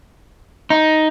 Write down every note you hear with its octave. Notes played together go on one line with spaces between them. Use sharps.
D#4